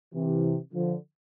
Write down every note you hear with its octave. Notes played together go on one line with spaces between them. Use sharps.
C3 E3
D3 F3